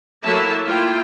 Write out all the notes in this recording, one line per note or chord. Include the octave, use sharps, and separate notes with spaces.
F#3 A#3 E4 A4 E5 A5
A#3 E4 F4 G5